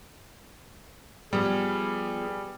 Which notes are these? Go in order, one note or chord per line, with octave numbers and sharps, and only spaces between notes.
F3 G3 B3 G#4